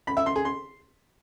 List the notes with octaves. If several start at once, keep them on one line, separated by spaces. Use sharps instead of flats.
B5
E5
C6
G#4
C6